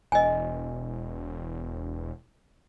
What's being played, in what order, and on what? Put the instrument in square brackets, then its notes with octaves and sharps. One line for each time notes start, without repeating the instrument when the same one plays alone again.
[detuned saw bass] E1 [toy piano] D#5 G#5